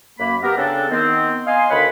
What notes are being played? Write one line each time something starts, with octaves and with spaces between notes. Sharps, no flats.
F#2 A#3 B5
B3 G4 A#4
C#3 C4 D4 A4
D#3 B3 C4
D#5 F5 G#5 C6
D2 D#3 C#5 F5 F#5 B5